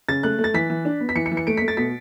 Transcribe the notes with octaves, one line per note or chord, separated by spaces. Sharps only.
C#3 A6
A3 F#6
A3
A6
E3 B6
E3
D4
B3
B6
E3 C#7
C#7
E3
C#7
A3 D7
B6
A3
A6
B2 B6